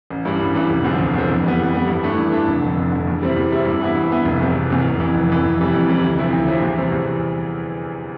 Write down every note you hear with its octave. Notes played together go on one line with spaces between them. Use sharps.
A1
G2 E3 G3
A1
G2 E3 G3
F1
E2 D3 F3
F1
E2 D3 F3
F2
E3 G3 B3
F2
E3 G3 B3
G2
E3 A3 D4
G2
E3 A3 D4
F1
F2 D3
F1
F2 D3
E2
C3 G3 C4 E4
E2
C3 G3 C4 E4
G2
E3 B3 E4
G2
E3 B3 E4
F1
E2 C3
F1
E2 C3
F1
F2 E3
F1
F2 E3
F2
C3 E3 G3
F2
C3 E3 G3
D2
C3 F3 C4 E4
D2
C3 F3 C4 E4
E2
C3 E3 G3 C4
E2